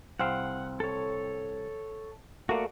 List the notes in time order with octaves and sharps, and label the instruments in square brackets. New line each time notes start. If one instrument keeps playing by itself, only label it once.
[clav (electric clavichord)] C2 C4 F5 [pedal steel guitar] F#5
[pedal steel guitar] A4 C#5
[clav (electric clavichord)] A3 A#3 [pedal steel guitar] F#4 D5